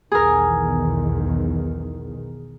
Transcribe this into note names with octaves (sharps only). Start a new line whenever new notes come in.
B1 E2 D#3 G#4 A#4